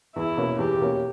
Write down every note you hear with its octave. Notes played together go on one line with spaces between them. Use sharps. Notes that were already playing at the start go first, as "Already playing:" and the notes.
E2 E4
B2 A#3 C#4
E2 G4
B2 A#3 C#4